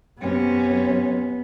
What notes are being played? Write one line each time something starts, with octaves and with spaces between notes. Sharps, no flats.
F#2 C3 B3 C#4